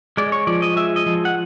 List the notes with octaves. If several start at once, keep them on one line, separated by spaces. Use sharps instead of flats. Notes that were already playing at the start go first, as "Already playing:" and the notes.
G#3 D5
C#5
F3 D5
D#5
G#3 E5
D#5
F3
F#5